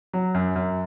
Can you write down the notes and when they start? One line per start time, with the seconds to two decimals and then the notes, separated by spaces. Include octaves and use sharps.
0.13 F#3
0.34 F#2
0.56 F#2